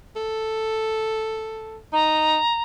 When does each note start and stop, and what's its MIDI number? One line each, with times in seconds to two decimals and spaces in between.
0.16 1.77 69
1.93 2.39 63
1.93 2.63 82